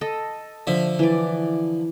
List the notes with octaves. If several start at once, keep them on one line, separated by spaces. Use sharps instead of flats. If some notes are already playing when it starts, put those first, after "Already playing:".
A4 D#5
D3 F3 E5
E3 D5